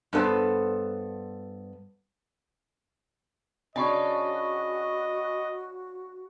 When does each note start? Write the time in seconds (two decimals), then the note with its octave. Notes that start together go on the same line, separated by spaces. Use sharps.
0.13 G2 B3 A4 C5
3.76 C#3 C#4 D4 F#4 D#5 G#5 B5 C#6